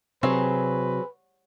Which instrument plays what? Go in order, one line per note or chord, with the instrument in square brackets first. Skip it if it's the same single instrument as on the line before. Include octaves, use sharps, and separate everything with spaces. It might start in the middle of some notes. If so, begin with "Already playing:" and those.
[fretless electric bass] C3 [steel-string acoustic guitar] F#3 [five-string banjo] C4 G#4 [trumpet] B4